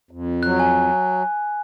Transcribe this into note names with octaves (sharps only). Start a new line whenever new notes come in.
F2
F#3 F#6
G#5